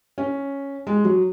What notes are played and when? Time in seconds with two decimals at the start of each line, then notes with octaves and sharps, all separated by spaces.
0.18 C#4
0.87 G#3
1.04 F#3